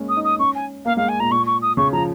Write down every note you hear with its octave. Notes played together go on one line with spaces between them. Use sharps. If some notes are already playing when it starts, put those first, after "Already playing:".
Already playing: G#3 A#3 C#4
D#6
D#4
D#6
C#4 C#6
G#5
A#3 F5
G#3 F5
G#5
A#2 A#5
A#2 C#6
C#6
D#6
C#3 C#6
F3 A#5